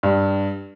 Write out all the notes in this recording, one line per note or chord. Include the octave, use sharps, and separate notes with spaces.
G2